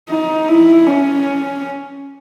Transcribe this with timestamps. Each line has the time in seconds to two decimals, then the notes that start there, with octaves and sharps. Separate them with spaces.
0.10 D#4
0.49 E4
0.87 C#4